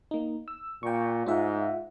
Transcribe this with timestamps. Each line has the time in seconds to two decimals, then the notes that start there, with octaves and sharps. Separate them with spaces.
0.11 A#3 D#4
0.48 E6
0.83 A#2 G5 C#6
1.26 G#2 F4 E5 F#5